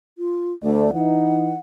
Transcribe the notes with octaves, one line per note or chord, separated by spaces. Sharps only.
F4
D2 A3 D5
E3 D#4 F#5